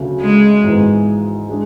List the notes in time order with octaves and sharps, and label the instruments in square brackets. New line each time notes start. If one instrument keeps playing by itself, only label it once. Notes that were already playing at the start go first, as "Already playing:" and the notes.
Already playing: [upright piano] D2 C#3 F#3 A3
[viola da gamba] G#3
[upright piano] G#1 G#2 E3 G#3 B3
G#3 D4 G#4